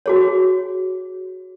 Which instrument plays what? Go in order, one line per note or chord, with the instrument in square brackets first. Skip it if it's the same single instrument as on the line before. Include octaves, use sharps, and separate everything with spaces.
[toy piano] F#4 G#4 C#5